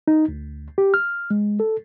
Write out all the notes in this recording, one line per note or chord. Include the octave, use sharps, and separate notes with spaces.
D#4
D2
G4
F6
G#3
A4